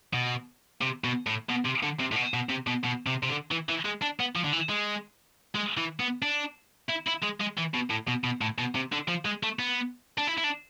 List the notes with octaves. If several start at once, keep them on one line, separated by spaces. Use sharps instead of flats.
B2
C3
B2
A2
B2
C3
D3
C3
A2
B2
B2
C3
B2
B2
C3
C3
D3
E3
E3
G#3
D4
B3
F3
D3
E3
G#3
G#3
E3
B3
D4
E4
E4
G#3
G#3
E3
B2
A2
B2
B2
A2
B2
C3
D3
F3
G#3
A3
B3
D4
E4
E4
D4